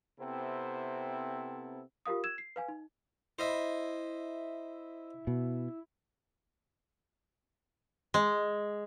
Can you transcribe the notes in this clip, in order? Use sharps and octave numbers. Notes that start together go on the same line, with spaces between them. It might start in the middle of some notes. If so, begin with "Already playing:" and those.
C3 B3 C4 E4 A4
F4 G4 A#4 F5 D#6
E6 G#6 E7
C7
B4 F5 G#5
D#4
E4 C5 D#5 E5
B2
G#3